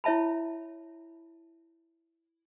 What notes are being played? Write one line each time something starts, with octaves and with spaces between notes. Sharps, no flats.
E4 C#5 E5 A5 B5